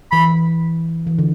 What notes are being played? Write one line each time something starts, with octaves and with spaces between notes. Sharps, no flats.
E3 B5
E3
E3
D3